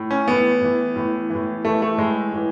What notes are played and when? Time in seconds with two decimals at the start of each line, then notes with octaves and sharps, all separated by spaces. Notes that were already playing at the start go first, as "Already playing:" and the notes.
Already playing: A2
0.11 C#4
0.28 A2 E3 B3
0.61 A2 E3
0.96 A2 E3
1.30 A2 E3
1.65 A2 E3 A3
1.82 A3
1.98 A2 E3 G#3
2.33 A2 E3